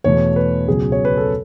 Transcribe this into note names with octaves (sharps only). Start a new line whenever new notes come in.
E2 B2 A3 C#5
B4
C#2 B2 F#3 G#4
C#5
B4
A4